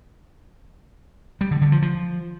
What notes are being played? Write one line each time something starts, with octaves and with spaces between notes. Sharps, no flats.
G3
D3
D3
F3
F3